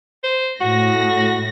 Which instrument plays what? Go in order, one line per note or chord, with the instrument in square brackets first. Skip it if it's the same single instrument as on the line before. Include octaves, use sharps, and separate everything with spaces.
[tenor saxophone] C5
[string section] A2 A#6 [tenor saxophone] F#4